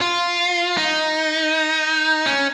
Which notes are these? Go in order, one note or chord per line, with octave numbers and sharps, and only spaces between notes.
F4
D#4
C#4